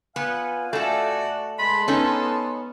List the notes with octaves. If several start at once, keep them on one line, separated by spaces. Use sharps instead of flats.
A#2 B3 F5 G#5
A3 F#4 A4 D5
G#3 B4 A5 B5 C6
B3 C#4 D#4 A4